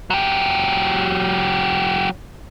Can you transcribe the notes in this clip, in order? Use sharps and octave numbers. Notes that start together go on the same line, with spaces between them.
F#3 G4